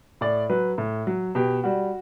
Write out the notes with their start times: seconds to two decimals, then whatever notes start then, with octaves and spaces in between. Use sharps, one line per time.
0.21 A2 D5
0.49 F#3 B4
0.78 A2
1.07 F#3
1.35 B2 G4
1.64 G3 F#4